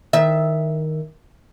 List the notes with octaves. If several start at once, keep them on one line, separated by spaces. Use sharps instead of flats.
D#3 E5